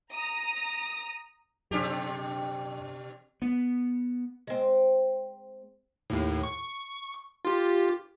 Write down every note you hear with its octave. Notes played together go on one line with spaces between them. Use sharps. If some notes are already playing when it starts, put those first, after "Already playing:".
A#5 D#6 A#6
F#2 B2 D4 G4
B3
G#3 C4
D#2 A2
C#6
F4 G4